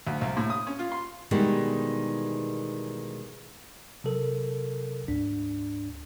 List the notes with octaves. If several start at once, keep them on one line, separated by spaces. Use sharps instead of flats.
D2
C2
A2
D#6
C#4
F4
C6
B2 D#3 E3 G3 G#3
C3 F#3 A4 A#4
D2 G#2 D4